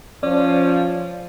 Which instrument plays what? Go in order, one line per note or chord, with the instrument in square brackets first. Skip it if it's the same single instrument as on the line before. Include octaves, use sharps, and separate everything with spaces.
[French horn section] F3 [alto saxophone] C#4 [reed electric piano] D5